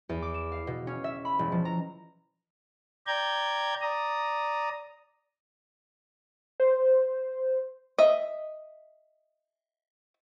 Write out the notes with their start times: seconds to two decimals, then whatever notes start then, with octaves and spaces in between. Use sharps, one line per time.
0.09 E2
0.22 D6
0.34 E7
0.52 F5
0.67 B2
0.87 C#4
1.04 E5
1.25 B5
1.39 E1
1.52 F3
1.65 A#5
3.07 D5 G5 A#5 G6 G#6
3.81 D5 A#5 D#6
6.60 C5
7.98 D#5 E5